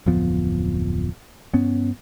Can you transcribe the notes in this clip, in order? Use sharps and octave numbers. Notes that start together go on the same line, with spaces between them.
D1 F2 F3 B3
G2 B3 C#4